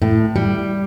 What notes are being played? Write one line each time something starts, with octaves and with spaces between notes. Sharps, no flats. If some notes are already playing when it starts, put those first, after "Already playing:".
A2
G3